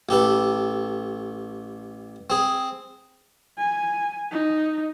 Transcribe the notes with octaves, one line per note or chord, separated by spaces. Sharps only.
A1 G4 A4 B4
C4 G#4
G#5
D#4